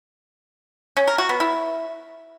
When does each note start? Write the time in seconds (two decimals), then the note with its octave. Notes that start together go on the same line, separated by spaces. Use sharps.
0.97 C#4
1.07 A#4
1.18 F#4
1.29 B3
1.40 E4